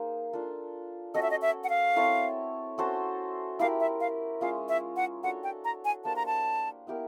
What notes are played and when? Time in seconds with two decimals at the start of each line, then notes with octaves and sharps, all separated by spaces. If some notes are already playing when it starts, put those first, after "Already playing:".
Already playing: A#3 D#4 G#4 C5
0.33 D4 F4 A4
1.14 C#4 F#4 A4 D#5
1.22 E5
1.31 D#5
1.42 E5
1.64 F#5
1.70 F5
1.96 C4 E4 A4 C#5
2.78 C#4 F#4 A4 C5
3.59 E4 G4 A#4 F5
3.80 E5
4.00 F5
4.41 G#3 C#4 F4 F5
4.69 E5
4.96 F#5
5.23 D4 F#4 A4 C#5 F#5
5.44 G5
5.65 A#5
5.85 G#5
6.05 A#3 D4 G4 C5 A5
6.16 A#5
6.26 A5
6.87 B3 E4 G4 A#4